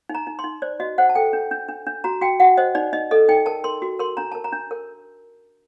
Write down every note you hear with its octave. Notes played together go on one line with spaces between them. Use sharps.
D#4
A#5
D#4
C6
D#4
C5 D5
F#4 D#5
C5 F#5
A5
A4 G5
D4
D4
D4
D4
F#4 A#5
F#4 G5
F#4 F#5
C5 D#5
D#4 D5
D#4 D#5
A4 D#5
D#4 G5
A#4 A5
A#4 C6
F#4
A#4 C6
D4 A#5
A#4 A5
A#5
D4
A#4